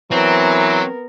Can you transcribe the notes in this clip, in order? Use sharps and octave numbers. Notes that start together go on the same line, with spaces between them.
E3 F#3 B3 C4 A#4